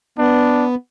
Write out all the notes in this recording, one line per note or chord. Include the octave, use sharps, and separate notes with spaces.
B3 D4